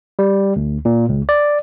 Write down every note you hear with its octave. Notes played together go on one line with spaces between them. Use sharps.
G3
D2
A#2
C#2
D5